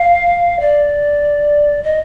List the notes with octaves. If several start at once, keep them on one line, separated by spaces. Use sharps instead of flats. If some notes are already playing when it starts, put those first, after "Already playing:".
Already playing: F5
D5
D#5